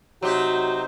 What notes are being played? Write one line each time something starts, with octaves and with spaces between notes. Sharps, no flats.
C3 F#3 D#4 F#4 G4 C5